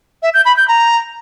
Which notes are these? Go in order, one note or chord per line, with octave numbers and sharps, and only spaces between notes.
E5
G6
B5
G6
A#5